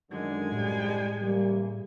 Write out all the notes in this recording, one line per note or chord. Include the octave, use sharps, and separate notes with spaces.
F#2 D3 D#3 G#3 G#5
C2 A2 D3 G3
C#3 E3 G3 A#3